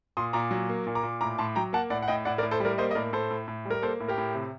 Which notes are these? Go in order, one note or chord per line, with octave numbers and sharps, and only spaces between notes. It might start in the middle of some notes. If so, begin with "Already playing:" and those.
A#2 C6 D#6
A#2 A#5 D6
F#3
A#3
A#2
A#5 D6
A#2
A2 A#5 D6
A2 A5 C6
F#3 G5 A#5
A#3 F#5 A5
A2 D5 F#5
F#5
A2 D#5 G5
A2 D5 F#5
A#4 D5
A2
A4 C5
G3 A#4 D5
A#3 C5 D#5
D#5
A2 A#4 D5
A2 A4 C5
A2
A2
G3
A#4
A#3 A4 C5
A2
G4 A#4
A2
C3